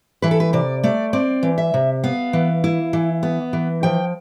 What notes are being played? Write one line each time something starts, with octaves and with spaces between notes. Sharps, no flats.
E3 B4
A4
B4
C3 D5
A3 D5
C4 D5
E3
E5
C3
B3 F5
E3
E4
E3
B3
E3
F3 G5